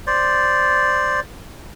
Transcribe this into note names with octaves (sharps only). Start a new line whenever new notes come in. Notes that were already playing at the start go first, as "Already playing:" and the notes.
C5 D5